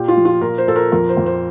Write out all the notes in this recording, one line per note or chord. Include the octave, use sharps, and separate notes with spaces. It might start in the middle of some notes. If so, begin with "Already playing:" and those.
Already playing: A#2 G4
F4
F3
F4
A#2 A#4
C5
A#2 A4
A#4
F2 A#4
C5
F2
C5